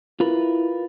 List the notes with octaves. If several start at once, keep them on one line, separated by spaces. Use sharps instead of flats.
E4 F4 A#4 B4